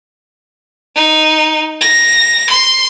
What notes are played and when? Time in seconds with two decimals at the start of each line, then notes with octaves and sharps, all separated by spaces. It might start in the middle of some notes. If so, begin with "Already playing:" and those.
0.95 D#4
1.81 A#6
2.49 C6